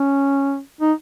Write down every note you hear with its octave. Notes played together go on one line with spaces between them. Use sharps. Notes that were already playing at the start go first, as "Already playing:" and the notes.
Already playing: C#4
D#4